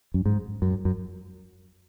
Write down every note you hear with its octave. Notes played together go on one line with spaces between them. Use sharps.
F#2
G#2
F#2
F#2